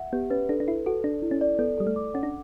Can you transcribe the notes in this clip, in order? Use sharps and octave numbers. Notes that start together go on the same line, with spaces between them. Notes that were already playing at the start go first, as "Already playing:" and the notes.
Already playing: E5 F#5
B3 G4
C#4 B4
D4 A4
D4
E4 A4
F#4 A4
D4 D5
E4
C#4
D5
B3 A4
G3 A4
A3
D6
C#4 F#5
D4